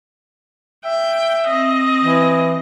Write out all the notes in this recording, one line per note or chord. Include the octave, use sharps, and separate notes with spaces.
E5 G5
C4 D#5
E3